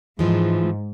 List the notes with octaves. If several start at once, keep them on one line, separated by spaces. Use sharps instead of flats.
G#2 E3 F3 G#3